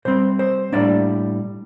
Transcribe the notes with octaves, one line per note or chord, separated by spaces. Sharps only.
C3 G3 C4 C5
C5
A2 G3 A#3 D4 D5